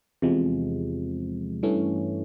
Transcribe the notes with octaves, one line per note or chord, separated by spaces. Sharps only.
E2 C3 F3 G#3
G2 E3 A3 C#4